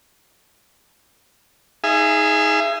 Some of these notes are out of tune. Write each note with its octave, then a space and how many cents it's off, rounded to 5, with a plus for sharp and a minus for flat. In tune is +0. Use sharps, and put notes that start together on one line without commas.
D#4 +20 G#4 +0 E5 +45